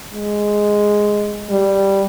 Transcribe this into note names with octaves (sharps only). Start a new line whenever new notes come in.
G#3
G3